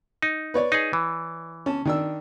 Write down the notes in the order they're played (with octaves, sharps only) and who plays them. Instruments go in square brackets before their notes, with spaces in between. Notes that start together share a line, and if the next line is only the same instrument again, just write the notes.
[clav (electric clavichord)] D#4
[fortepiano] B4 C#5 D5
[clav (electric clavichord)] D#4 G#4
E3
[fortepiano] C#4 A5
D#3 D4 E6